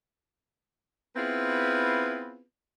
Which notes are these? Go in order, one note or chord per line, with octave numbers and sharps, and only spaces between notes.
B3 C4 E4 F4 G#4 B4